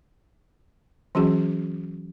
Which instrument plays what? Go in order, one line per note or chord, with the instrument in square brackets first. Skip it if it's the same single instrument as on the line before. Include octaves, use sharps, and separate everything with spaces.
[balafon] E3 F#3 C#4 F#4 G#4